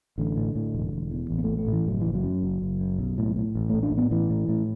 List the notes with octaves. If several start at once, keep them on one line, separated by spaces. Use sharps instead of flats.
A1 D3
A2
A2
E1
E1
E2
A1
B3
A2 A3
A3
A2
E3
F#1 F#3
F#1 E3
F#3
F#2
F#1
F#1
F#2
B1
A2
A2
A1
A2 A3
D4
A2
B3
A1 E3
A2
A2